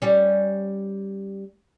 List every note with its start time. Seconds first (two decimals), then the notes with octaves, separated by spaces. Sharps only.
0.02 G3 C#4